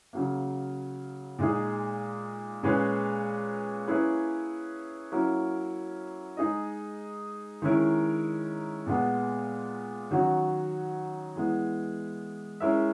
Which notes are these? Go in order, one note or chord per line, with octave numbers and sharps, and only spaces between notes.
C#3 F#3 A#3
A#2 G#3 D#4 G#4
A#2 G#3 C#4 G#4 B4
A#3 C#4 E4 G#4 B4
F#3 A#3 C#4 E4 A#4
G#3 D#4 G#4 D#5
D#3 G#3 C#4 E4 A#4
A#2 G#3 B3
D#3 F#3 C#4 F#4
E3 G#3 B3
G#3 C#4 E4 A#4 E5